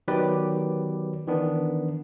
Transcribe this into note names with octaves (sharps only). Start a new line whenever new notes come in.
D#3 F#3 B3 G4 B4 D5
D#3 E3 B3 D4